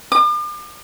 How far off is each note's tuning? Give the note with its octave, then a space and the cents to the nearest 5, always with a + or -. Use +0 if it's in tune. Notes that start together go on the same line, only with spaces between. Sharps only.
D6 +40